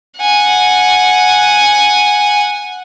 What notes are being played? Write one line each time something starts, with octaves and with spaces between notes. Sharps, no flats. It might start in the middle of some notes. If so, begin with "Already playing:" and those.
F#5 G#5